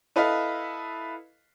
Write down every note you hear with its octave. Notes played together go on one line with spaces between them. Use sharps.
E4 A4 B4 D#5 F5